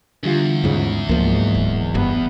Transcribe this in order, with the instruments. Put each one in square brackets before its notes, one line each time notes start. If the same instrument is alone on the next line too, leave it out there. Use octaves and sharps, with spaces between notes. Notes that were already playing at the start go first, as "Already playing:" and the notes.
[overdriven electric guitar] E2 [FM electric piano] D3 G3 F4
[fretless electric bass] D#2 G#2 C#3
[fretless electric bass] C#2 F3 [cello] G#2 [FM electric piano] F#3 A#3
[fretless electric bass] D1
[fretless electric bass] F#1 G2 [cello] B3